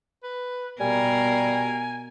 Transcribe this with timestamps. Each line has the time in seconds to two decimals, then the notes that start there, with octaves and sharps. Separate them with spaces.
0.23 B4
0.80 B2 G3 A#4 G#5